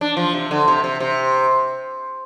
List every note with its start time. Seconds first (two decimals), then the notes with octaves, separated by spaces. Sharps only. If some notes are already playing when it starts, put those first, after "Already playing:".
0.01 D4
0.17 F3
0.33 C3
0.51 D3
0.68 C3
0.84 C3
1.00 C3